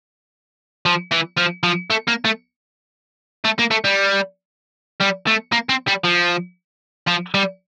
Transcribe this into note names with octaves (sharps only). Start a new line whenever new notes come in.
F3
E3
F3
F3
A3
A#3
A3
A3
A#3
A3
G3
G3
A3
A#3
C4
G3
F3
F3
G3